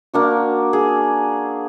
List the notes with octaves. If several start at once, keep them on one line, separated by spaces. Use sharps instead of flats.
A#3 D4 F#4
G#4